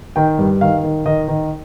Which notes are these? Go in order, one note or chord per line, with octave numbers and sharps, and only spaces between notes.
D#3 G5
G2
D#3 F5
D#3
D#3 D#5
D#3